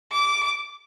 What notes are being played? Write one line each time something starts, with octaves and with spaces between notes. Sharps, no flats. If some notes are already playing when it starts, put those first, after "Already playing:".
D6